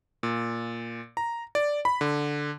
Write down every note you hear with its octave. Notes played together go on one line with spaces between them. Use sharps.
A#2
A#5
D5
B5
D3